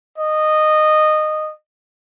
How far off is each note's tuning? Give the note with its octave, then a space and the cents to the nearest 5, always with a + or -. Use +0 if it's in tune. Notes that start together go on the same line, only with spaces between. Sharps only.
D#5 -15